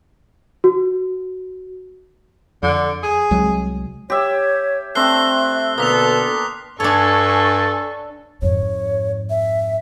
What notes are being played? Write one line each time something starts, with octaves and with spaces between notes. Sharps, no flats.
F#4
F2 D3
G#4
C2 F#3 G#3
G4 C#5 E5
A3 C4 D4 E5 F#6 C7 G7
B2 D3 A#3 A4 B4 D#6 B6 F7
G2 D4 A4 C#5 G#5 C#6
F2 G#2 C#5
E5